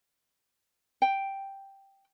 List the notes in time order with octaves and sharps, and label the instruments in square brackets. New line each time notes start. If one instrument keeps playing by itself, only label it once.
[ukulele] G5